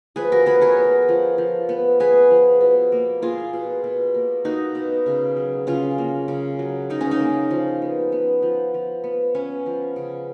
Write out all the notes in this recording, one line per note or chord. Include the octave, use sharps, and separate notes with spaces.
F3 G#4 B4
F#4 A#4
B3 G#4 B4
A#4 C#5
B3
F3
F3
B3
B3 G#4 B4
F3
B2
A#3
A#3 F4 G#4
B2
B2
A#3
A#3 D#4 F#4
B2
C#3
F#3
C#3 C#4 F4
A#3
C#3
F#3
C#3 D#4
C#4
D#4
A#3
F3
B3
B3
F3
F3
B3
B3 C#4
F3
C#3